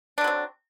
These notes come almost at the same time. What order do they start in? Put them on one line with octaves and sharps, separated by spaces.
D4 D3 F#3 C4